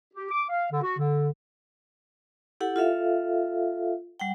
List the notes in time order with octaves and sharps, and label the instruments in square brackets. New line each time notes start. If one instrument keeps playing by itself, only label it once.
[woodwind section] G4
D6
F5
D3
F#4
D3
[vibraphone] E4 G4 A4 F#5
F4 A4 E5 F5
G3 F#5 G5